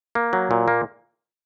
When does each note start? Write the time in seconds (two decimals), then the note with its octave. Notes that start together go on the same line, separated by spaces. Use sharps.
0.15 A#3
0.33 F#3
0.51 A#2
0.68 A#3